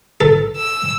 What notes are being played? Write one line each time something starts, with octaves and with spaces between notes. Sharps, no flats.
A4
E6